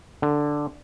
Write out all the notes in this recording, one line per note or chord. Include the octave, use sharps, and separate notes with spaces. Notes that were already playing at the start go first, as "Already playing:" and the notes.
D3